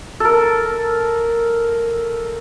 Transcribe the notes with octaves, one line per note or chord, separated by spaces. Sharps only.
A4 A#4